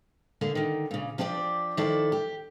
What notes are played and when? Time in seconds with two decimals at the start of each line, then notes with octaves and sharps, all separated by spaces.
0.41 D3 A#3 G#4
0.55 D3 D#3
0.91 A#2 C#3
1.18 F3 D4 G4 C#5 D5
1.77 D#3 F3 E4 A4 D5
2.12 G4